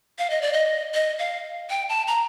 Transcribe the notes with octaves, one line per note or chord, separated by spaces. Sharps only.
F5
D#5
D5
D#5
D#5
F5
G5
A5
A#5